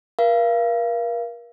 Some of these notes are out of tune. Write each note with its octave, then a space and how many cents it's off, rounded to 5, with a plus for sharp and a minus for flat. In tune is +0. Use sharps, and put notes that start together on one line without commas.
A#4 +35 F5 -30